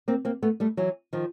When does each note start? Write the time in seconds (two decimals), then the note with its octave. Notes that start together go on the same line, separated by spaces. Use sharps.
0.08 A#3 C4
0.25 A#3 C4
0.43 A3 B3
0.60 G3 A3
0.77 E3 F#3
1.13 D#3 F3